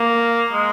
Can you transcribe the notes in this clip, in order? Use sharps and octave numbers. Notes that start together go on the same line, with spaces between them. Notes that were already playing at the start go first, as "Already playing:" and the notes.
Already playing: A#3
G#3